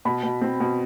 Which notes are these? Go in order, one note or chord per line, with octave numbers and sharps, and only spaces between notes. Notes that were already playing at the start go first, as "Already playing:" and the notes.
B2 B5
B2
C4
B2